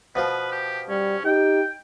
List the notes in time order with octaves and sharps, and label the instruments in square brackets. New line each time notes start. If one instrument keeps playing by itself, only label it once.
[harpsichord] B2 F3 F4 [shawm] B4
[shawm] G4
[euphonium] G3 [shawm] C#4
[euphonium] D#4 [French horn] G4 [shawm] G5